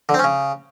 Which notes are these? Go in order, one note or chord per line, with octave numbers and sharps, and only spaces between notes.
D3
C4
C#4
C#3